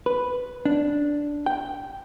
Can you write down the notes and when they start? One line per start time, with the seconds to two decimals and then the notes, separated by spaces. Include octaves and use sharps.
0.06 B4
0.65 D4
1.46 G5